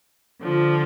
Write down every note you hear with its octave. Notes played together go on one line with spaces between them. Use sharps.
D3 F3